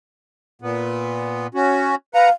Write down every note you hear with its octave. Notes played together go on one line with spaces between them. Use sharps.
A#2 B3
C#4 F#4
B4 F5 F#5 A#5